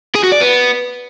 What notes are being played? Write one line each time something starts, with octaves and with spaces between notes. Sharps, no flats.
G#4
F#4
D5
B3